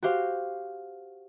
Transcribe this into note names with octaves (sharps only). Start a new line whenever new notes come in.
F#4 G4 C5 F5